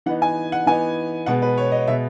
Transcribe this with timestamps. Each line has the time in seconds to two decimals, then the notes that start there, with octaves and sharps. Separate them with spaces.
0.06 E3 B3 D#4 F#5
0.22 G#5
0.52 F#5
0.66 E3 B3 D#4 G#5
1.26 B2 G#3 B3 F#5
1.42 B4
1.57 C#5
1.72 D#5
1.87 B2 G#3 B3 E5